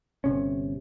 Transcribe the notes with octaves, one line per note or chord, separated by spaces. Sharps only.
G1 C3 C#4